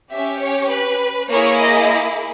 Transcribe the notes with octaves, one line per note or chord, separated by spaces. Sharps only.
C#4 G4 E5
C#5
B4
A#3 E4 G#4 C#5
D#5